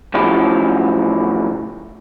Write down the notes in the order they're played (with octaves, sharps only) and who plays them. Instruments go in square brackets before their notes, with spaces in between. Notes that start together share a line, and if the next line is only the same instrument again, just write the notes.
[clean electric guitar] A2 C#3 F3 F#3 E4 G4